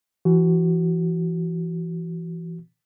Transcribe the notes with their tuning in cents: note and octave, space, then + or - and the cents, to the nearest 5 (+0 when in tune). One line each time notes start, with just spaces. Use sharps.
E3 +35 F#4 +25